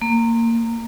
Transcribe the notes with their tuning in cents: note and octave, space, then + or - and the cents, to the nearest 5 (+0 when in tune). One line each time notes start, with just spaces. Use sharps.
A#3 -20